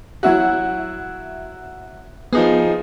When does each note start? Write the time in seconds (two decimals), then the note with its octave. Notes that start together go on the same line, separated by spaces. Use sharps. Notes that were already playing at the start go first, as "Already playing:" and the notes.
0.23 F#3 E4 F#4 E5 F#5
2.33 F3 B3 D#4 G#4